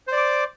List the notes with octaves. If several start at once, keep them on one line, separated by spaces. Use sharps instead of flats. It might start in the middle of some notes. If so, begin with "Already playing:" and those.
C5 D5 D6